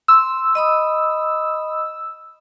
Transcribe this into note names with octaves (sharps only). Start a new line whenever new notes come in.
C6 E6
D#5 B5 D#6